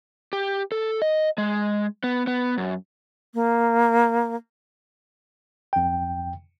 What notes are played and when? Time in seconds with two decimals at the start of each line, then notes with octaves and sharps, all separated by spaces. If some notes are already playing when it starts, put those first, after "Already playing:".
0.33 G4
0.72 A4
1.02 D#5
1.38 G#3
2.04 B3
2.27 B3
2.58 F#2
3.34 A#3
5.73 F2 G5